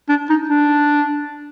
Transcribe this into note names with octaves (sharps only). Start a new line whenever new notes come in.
D4
D#4
D4